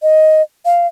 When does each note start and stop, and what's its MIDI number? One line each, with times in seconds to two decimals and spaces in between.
0.02 0.42 75
0.65 0.87 77